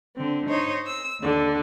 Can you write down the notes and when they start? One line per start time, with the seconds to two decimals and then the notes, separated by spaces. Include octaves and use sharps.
0.17 D3 C4
0.49 D#4 C5 C#5 D#5
0.86 E6
1.19 D#2 D3